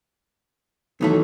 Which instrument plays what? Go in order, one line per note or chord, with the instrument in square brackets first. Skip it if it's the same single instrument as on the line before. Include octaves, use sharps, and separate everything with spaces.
[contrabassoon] B1 [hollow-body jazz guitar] D#3 E3 A3